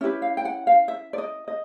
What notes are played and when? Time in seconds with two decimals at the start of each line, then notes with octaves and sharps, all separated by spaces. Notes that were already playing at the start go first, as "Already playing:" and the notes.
0.01 C#4 E4 G4 B4 E5
0.22 F5
0.37 G5
0.45 F#5
0.67 F5
0.88 E5
1.13 D5
1.18 D#5
1.48 D#5